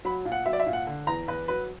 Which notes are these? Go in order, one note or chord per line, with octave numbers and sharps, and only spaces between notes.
F#3 B5
A#2
F#5
F#3 E5
D5
E5
A#2
F#5
D3
E2 A#5
E2 B4
F#3 B4